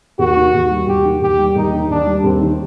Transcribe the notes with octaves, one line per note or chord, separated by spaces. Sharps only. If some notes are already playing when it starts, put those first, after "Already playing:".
D#2 F#4
D#3
D#2
G3
D#2 G4
D#3
D#2 G4
G3
D#2 D#4
D#3
D#2 D4
G3
D#2 C4
D#3